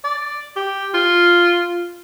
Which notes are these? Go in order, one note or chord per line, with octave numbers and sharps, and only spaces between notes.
D5
G4
F4